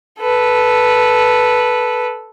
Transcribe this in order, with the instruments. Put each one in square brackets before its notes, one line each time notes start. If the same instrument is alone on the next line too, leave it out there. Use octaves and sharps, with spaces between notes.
[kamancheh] A4 B4